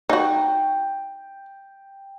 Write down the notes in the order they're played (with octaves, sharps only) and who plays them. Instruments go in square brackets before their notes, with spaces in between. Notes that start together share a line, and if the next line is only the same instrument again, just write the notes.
[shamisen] D#4 F#4 [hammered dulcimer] G5